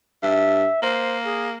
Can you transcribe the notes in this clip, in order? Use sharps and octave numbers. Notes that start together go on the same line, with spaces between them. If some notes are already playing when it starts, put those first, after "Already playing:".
G2 E5
A#3 C5
G#4